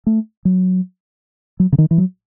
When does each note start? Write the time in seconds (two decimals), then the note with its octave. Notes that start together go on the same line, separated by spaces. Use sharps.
0.07 A3
0.45 F#3
1.60 F#3
1.72 C#3
1.78 D#3
1.91 E3
1.98 F#3